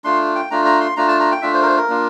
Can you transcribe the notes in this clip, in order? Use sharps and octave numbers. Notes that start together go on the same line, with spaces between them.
A3 D4 F4 C6
G5
A3 D4 F4 A#5
A#5
C6
A3 D4 F4 A#5
A5
A#5
G5
A3 D4 F4 E5
C5
A#4
C5
A#4
A#3 D4 F4